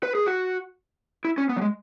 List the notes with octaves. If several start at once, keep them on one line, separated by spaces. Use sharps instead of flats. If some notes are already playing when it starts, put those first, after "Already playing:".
B4
G#4
F#4
E4
C#4
B3
F#3
G#3